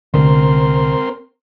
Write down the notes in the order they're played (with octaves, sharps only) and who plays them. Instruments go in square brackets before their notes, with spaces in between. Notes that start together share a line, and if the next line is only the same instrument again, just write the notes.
[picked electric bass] C2 D3 [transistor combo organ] C4 A#4 C6